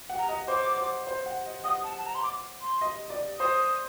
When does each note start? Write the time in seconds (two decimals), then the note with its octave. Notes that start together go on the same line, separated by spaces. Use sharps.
0.09 F#5
0.19 A#5
0.29 D#5
0.48 C5 D6
0.78 C5
1.07 C5
1.26 F#5
1.46 D#5
1.64 F#5 D#6
1.84 A5
1.98 A5
2.06 A#5
2.15 C6
2.23 D6
2.62 C6
2.81 D#5
3.10 D5
3.39 C5 D#6